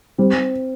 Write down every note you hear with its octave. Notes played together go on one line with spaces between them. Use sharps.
G3 C4